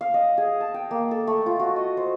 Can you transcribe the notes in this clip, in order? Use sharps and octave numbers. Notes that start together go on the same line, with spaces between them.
F5
D#5
G#4
A5
G5
A#3
A4
A3
F4
F#4
D#5
C5